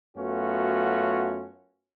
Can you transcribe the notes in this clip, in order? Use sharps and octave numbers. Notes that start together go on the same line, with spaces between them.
F#2 A3 B3 C#4 F4 F#4